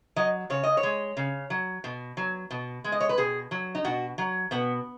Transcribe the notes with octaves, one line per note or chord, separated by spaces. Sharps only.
F#3 D#5
C#3 C#5
D#5
C#5
G#3
C#3
F#3
B2
F#3
B2
G#3
D#5
C#5
B4
B2 G#4
F#3
D#4
B2 F#4
F#3
B2 B3